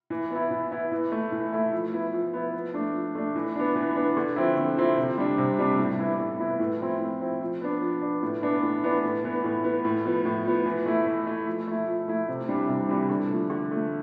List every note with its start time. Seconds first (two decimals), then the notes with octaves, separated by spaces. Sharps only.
0.10 E3
0.31 B3 E4
0.51 E3
0.71 B3 E4
0.92 E3
1.12 A3 E4
1.32 E3
1.53 A3 E4
1.73 F3
1.93 B3 E4
2.13 F3
2.34 B3 E4
2.54 F3
2.74 A3 D4
2.94 F3
3.15 A3 D4
3.35 E3
3.55 B3 D4
3.76 E3
3.96 B3 D4
4.17 D3
4.36 F3 C4 E4
4.57 D3
4.77 F3 C4 E4
4.97 C3
5.18 G3 D4
5.38 C3
5.59 G3 D4
5.78 A2
5.99 E3 B3 E4
6.19 A2
6.39 E3 B3 E4
6.60 A2
6.80 F3 C4 E4
7.00 A2
7.21 F3 C4 E4
7.41 F3
7.61 B3 D4
7.81 F3
8.02 B3 D4
8.23 A2
8.42 E3 B3 D4
8.63 A2
8.84 E3 B3 D4
9.03 A2
9.24 E3 B3
9.44 A2
9.64 E3 B3
9.85 A2
10.05 F3 B3
10.25 A2
10.46 F3 B3
10.66 E3
10.86 A3 E4
11.06 E3
11.27 A3 E4
11.47 F3
11.67 A3 E4
11.88 F3
12.08 A3 E4
12.28 C3
12.48 E3 G3 D4
12.69 C3
12.89 E3 G3 D4
13.10 D3
13.29 F3 A3
13.50 D3
13.70 F3 A3